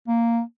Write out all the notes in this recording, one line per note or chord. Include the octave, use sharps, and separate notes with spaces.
A#3